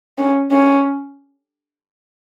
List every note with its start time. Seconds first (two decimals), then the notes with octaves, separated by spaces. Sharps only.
0.18 C#4
0.51 C#4